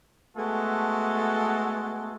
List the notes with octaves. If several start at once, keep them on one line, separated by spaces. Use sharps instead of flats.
G#3 A3 B3 F#4 A4